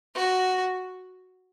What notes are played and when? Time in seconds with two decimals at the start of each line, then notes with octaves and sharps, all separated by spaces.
0.15 F#4